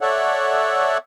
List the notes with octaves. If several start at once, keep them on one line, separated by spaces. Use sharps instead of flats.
A4 C#5 D5 E5 F#5